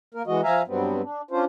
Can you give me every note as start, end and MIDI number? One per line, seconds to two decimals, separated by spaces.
0.14 0.23 58
0.14 0.23 70
0.27 0.41 52
0.27 0.41 56
0.27 0.41 66
0.27 0.41 75
0.44 0.62 53
0.44 0.62 76
0.44 0.62 77
0.44 0.62 80
0.44 0.62 82
0.68 1.02 43
0.68 1.02 54
0.68 1.02 55
0.68 1.02 59
0.68 1.02 60
1.03 1.22 62
1.31 1.45 61
1.31 1.45 62
1.31 1.45 65
1.31 1.45 72